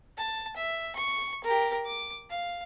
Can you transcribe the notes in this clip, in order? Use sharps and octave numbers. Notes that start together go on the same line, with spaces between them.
A5
E5
C#6
G4 A#4
D6
F5